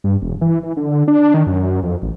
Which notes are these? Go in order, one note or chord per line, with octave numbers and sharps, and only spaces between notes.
G2
E1
E3
E3
D3
D4
D#3
F#2
F2
A1